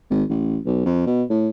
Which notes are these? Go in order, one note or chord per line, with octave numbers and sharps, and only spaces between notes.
G#1
A1
B1
F2
B2
A2